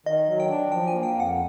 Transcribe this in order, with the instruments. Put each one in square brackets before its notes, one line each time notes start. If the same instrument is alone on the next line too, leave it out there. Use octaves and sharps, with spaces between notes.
[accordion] D#3 [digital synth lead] D#5
[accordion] F#3
[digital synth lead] G5
[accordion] D4
[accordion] F3 [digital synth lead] G5
[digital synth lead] G#5
[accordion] A#3
[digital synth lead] G5
[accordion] F2
[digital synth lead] F#5